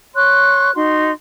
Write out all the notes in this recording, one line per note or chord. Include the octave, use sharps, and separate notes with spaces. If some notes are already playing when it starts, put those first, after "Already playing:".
C#5 C6 C#6 F#6
D#4 F#4 C6